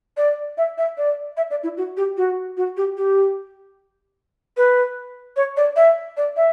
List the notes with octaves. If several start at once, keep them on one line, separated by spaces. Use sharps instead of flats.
D5
E5
E5
D5
E5
D5
E4
F#4
G4
F#4
F#4
G4
G4
B4
C#5
D5
E5
D5
E5